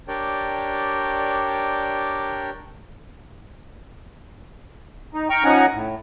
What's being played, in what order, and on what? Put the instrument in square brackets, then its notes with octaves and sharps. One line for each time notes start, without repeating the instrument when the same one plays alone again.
[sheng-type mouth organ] D4 G4 A#4 C#5 D5 G5
[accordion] D#4
G5 A#5 C#6 F6
F3 C#4 D#4 F#5 G#5 A#5
A2